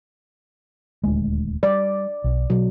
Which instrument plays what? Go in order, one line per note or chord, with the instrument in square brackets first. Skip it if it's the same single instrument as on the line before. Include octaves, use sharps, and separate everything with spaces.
[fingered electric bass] D#1 D2 G#3
[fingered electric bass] G3 [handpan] D5
[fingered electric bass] B1
[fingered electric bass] B2 [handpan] F#3